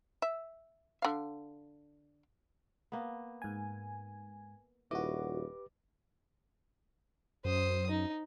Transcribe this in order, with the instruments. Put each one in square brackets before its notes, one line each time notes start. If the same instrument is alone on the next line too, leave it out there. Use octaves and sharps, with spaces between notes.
[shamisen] E5
D3 F5
[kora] A#3 B3
[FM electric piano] G#2 G#5
[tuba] D#1 [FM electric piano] E4 F#4 [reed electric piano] G4 B4 D6 [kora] D#5
[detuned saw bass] F#2 [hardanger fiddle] C5 D#6
[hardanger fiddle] D#4